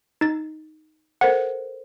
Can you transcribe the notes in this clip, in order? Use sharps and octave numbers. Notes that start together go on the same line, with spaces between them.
D#4 A6
A4 A#4 C5 F#5